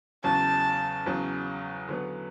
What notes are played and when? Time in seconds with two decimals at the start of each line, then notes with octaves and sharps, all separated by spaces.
0.24 E2 C#3 F#3 A5
1.06 E2 C#3 F#3
1.89 D3 F#3 B3